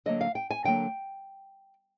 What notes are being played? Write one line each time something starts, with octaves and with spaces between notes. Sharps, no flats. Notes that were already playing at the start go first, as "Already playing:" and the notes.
D3 F#3 A#3 D#5
F5
G5
G#5
D3 F#3 A#3 G5